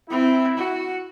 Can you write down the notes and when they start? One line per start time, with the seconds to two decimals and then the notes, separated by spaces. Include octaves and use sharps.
0.10 C4 E4
0.57 F#4